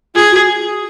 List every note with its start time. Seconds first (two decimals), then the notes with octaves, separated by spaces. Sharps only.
0.14 F4 G#4
0.31 F#4